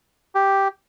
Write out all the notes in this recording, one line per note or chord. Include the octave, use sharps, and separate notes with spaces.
G4